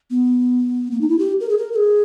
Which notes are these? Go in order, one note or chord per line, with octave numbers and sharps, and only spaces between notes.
B3
A#3
D#4
E4
G4
A#4
G#4
A#4
A#4
G#4